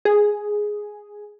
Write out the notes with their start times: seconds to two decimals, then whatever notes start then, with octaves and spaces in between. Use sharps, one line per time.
0.05 G#4